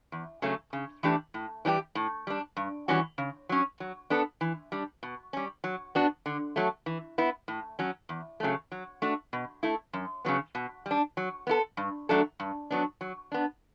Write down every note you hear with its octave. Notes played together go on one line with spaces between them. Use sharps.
E2
C#3 F#3 A3 C#4
C#3
E3 A3 D4 G4
A2
E3 G3 D4 G4
A2
G3 D4
G2
E3 G3 C#4 F#4
C#3
F#3 C#4
F#3
B3 D4 A4
E3
G3 D4
B2
G3 C#4
F#3
B3 D4 F#4
D3
F#3 A3
E3
B3 E4
A2
F#3 C#4
E2
C#3 F#3 A3
F#3
A3 D4 F#4
B2
A3 E4
F#2
C#3 F#3 B3
B2
G3
D4
F#3
B3 E4 A4
G2
F#3 A3 D4 A4
G2
F#3 B3 D4
F#3
B3 D4